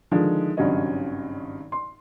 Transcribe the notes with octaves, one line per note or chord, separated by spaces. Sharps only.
D3 D#3 F3 G#3
G#1 G2 C#3 F#3 C#5 D#5
C6